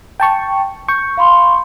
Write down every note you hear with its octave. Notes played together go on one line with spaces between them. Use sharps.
G5 A5 C#6
C#6 G6
F5 B5 C6